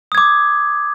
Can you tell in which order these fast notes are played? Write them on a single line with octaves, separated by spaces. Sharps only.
D#6 G#6 D6